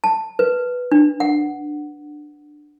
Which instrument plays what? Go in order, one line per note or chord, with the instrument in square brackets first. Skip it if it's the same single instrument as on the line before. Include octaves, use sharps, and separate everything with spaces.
[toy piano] A5
B4
D4
F#5